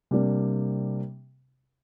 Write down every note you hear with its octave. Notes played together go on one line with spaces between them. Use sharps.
C3 G3 A#3 D4